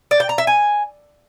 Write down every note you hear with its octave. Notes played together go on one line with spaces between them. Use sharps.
D5
G5
A#5
E5
G#5